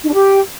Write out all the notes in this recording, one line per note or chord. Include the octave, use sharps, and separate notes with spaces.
D#4
D4
G4